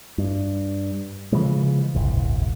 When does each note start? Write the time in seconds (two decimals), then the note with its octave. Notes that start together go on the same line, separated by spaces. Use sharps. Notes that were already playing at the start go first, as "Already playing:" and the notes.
0.18 G2
1.32 C#3 E3 F3 G#3
1.95 D1 G1 C2